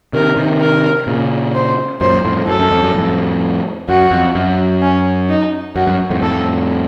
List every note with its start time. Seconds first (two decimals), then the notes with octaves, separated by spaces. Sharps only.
0.13 C3 D#3 A#4
0.37 C3 D#3
0.60 A#4
1.07 A#2 C#3
1.54 C5
2.01 F#2 A#2 C5
2.24 F2 A2
2.47 F#2 A4
2.59 F#2
2.71 F2
2.83 F#2
2.94 F2 A2
3.89 F#2 F#4
4.11 F2
4.35 F#2
4.82 C#4
5.29 D#4
5.76 F#2 F#4
5.87 F#2
6.10 F2 A2
6.22 F2 A2 A4